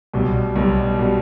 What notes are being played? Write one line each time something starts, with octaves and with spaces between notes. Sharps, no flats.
B1 B2 G3
B1 B2 G3
B2 G3